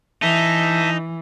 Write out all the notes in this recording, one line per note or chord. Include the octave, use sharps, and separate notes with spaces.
E3 D#4 E5 A5